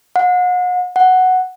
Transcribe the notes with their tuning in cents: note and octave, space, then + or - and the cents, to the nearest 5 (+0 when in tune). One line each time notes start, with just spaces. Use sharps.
F#5 -40
F#5 +0